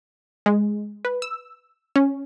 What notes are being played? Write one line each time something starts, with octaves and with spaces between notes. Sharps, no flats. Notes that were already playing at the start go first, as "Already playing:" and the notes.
G#3
B4
E6
C#4